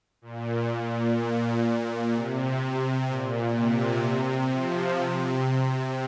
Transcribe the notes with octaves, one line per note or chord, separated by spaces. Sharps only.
A#2
A#2
A#2
C3
A#2
C3
C3
F3
C3